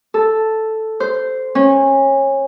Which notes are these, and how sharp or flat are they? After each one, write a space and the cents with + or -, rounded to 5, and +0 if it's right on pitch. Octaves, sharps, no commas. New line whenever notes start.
A4 +0
C5 -10
C#4 -25